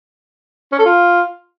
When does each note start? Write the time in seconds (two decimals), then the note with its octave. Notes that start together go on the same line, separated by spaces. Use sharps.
0.72 C#4
0.79 A4
0.85 F4